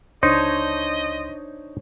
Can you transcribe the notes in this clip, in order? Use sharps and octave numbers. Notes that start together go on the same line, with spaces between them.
C#2 D4 D#4 C5 C#5 D#5 C6